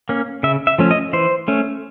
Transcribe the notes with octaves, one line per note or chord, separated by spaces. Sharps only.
A#3 C#4
C#3 E5
E5
F3 A3 C#4
D#5
E3 C5
A3 C#4